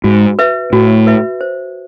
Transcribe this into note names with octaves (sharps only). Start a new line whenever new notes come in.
G#2 F#4
B4 E5
A2 F#4
B4 E5
C5